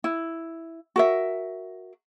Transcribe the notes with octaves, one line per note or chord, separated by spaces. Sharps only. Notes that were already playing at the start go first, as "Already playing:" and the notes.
E4
F#4 A#4 E5